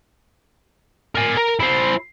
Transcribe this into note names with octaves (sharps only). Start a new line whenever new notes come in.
A#4 G#5
A#4
E4 C5